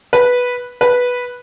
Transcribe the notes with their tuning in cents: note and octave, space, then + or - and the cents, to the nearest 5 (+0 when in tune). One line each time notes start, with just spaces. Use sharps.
B4 -5
B4 -5